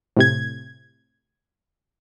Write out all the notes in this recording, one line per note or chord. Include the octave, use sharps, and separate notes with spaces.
A2 C3 G#6